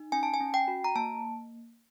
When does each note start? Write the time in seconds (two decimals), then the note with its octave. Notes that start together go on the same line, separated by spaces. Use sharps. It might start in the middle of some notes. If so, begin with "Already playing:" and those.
Already playing: D#4
0.12 C#4 G#5
0.23 A5
0.34 G#5
0.40 C#4
0.54 G5
0.68 F#4
0.84 A#5
0.95 A#3 A5